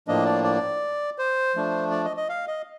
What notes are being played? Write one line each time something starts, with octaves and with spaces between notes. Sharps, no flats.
A2 F3 A#3 D4 D#5
D5
D5
C5
F3 A3 D4
D5
D#5
D#5
F5
D#5